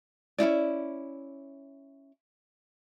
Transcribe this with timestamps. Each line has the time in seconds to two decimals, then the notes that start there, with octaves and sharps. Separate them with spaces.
0.38 C#4 D#4 E4 D5